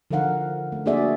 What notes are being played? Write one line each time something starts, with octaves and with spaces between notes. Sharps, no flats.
D3 F3 D#4 A#4 F5 F#5
A3
A#3 D4 F#4 G#4 D5 E5